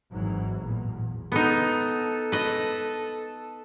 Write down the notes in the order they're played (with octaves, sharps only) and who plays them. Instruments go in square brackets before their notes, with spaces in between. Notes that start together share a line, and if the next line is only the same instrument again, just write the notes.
[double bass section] G#1 G#2 E3 F#3
A1 E2 A#2
[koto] B3 D#4 [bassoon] A4
[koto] B4 D#5